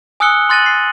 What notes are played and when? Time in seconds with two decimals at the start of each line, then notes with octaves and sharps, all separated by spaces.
0.20 G#5 D#6 E6 F#6 C#7 G7
0.49 C6 F#6 A6 A#6 D#7 F#7
0.66 C7